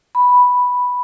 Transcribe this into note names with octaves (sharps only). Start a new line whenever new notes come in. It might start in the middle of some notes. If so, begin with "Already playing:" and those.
B5